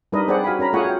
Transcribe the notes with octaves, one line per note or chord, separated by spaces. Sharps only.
G3 D4 D#4 A#4 B4 D#5
C4 G#4 C5 D5 F#5
F#4 F5 G#5 B5
C#4 A#4 A#5 B5
A3 F4 G#4 C#5 F#5 G#5
F#4 G5